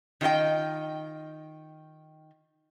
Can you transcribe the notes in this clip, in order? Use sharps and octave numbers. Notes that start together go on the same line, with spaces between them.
D#3 F4 G#4 D#5 G5